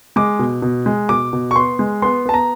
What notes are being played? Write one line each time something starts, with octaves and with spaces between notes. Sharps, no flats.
G#3 D6
B2
B2
G#3
B2 D6
B2
C#6
B3 C6
G#3
B3 C6
B3 A5
A#5